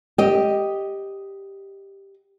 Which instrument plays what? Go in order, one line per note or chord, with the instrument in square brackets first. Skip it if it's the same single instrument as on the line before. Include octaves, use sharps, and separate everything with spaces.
[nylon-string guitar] G4 D#5